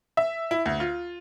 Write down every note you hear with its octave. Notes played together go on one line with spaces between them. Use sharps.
E5
E4
D2
F4